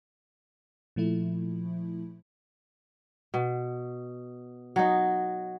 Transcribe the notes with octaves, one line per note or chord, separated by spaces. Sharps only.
A#2 F3 A3 E4
B2
F#3 D#4